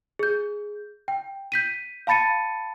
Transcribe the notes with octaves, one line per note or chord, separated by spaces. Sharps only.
G#4 G6
G5
G6 B6 D#7
F5 A5 B5 A6 C#7 D#7